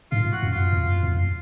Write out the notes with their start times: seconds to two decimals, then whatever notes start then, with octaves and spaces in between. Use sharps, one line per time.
0.12 G#2 F4
0.32 F#4
0.43 F#2
0.52 F4
0.73 F2
1.03 F2